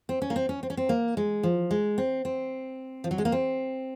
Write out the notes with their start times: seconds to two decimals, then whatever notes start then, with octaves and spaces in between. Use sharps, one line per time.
0.09 C4
0.22 C#4
0.30 A#3
0.36 C4
0.49 C#4
0.63 C4
0.70 C#4
0.77 C4
0.89 A#3
1.17 G#3
1.43 F3
1.71 G#3
1.98 C4
2.25 C4
3.04 F3
3.11 F#3
3.18 G#3
3.25 A#3
3.32 C4